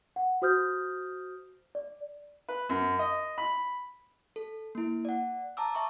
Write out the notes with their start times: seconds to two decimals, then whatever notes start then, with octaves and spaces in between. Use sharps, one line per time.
0.16 F#5
0.42 F#4 C5 D#6 F6 G6
1.75 D5
2.49 B4
2.69 F#2
2.99 D#5
3.38 B5
4.36 A4
4.75 A#3 E4
5.05 D5 F#5
5.57 A5 A#5 D6 E6
5.75 E5 A5 C#6